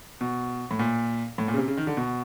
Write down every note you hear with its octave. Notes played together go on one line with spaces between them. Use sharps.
B2
A2
A#2
A2
A#2
C#3
C3
C#3
D#3
D3
B2